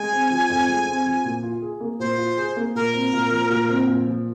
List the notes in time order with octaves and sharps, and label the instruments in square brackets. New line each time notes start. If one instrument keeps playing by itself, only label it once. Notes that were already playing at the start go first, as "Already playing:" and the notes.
Already playing: [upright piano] G#3 [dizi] G#5
[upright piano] C4
F3
F2
G#3
C4
F3
A#2
F4
G#4
A#3
[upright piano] A#2 [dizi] C5
[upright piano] F4
G#4
A#3
[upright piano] A#2 [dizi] A#4
[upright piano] C4
A#2
F3
A#2
C4
A#2
F3